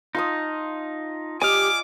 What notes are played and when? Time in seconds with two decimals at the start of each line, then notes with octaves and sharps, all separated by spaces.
0.15 D#4 F4 A5 D#6
1.42 G4 D5 D#5 G#5 D6 F6